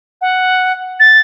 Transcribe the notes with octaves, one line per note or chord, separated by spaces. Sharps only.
F#5
A6